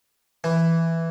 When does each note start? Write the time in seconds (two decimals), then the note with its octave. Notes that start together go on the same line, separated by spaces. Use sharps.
0.44 E3